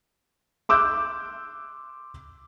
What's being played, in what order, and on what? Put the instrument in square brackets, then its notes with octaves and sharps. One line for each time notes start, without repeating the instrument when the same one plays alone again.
[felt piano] C6 D6 E6 F#6 G6